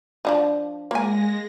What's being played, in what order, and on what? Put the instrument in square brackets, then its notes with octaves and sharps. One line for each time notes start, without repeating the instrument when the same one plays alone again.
[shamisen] F3 D4 D#4
[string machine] G#3 A#6 [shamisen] A#3 G#5